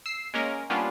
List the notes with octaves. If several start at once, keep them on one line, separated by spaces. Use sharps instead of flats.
E6 C7
G#3 A#3 C#4 A#4
G3 A#3 B3 C#4 D4 F4